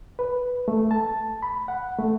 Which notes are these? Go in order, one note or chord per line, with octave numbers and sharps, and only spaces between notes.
B4
A3
A5
B5
F#5
A3